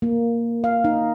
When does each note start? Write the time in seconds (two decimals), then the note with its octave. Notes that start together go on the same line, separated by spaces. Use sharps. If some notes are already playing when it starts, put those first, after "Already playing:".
0.02 A#3
0.64 F5
0.84 D#4